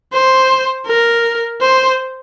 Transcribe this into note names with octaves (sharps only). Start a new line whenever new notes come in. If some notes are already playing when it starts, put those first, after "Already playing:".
C5
A#4
C5